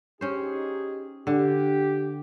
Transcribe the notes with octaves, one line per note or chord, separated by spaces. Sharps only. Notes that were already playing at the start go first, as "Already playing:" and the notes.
C#4 D#4 G4 G#4 C5
D3 G4